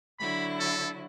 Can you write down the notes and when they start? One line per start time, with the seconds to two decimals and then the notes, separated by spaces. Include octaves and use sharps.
0.19 D3 F#3 E4 B5
0.60 A4